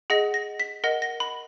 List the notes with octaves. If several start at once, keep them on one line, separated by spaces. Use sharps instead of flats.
G#4 D#5 F#5 A#6
A#6
B6
A#4 D#5 F#5 A#6
A#6
B5